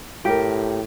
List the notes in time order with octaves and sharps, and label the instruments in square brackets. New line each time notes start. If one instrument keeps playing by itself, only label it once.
[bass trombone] A2 [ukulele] G4 A#4